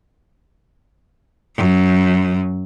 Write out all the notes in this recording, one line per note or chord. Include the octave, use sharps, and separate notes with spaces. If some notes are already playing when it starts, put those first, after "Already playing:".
F#2